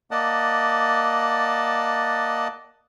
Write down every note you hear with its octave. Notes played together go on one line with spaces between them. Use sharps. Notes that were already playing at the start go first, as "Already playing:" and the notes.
A#3 D5 D#5 F#5 A5